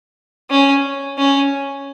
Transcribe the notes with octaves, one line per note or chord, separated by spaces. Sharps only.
C#4
C#4